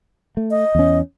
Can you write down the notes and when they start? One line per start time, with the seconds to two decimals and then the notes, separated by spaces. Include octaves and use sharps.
0.37 A3
0.51 D#5
0.75 E2 C#4